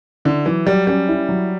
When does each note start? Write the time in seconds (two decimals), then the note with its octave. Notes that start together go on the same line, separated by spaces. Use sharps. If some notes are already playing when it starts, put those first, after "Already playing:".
0.25 D3 E4
0.46 E3 F#3
0.67 F#3 G3
0.87 G3 C#4
1.08 E4
1.29 F#3